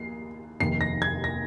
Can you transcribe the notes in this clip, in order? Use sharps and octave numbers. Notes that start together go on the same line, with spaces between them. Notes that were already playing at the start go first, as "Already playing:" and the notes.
Already playing: D#2 C7
F1 D#2 D#3 C7
A#6
G#6
A#6